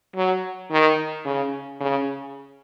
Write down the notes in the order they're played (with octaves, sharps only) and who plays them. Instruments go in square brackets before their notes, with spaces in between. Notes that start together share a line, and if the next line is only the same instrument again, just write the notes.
[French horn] F#3
D#3
C#3
C#3